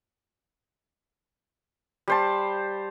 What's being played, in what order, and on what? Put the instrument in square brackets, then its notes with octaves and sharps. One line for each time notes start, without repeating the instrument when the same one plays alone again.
[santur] G3 C5 A5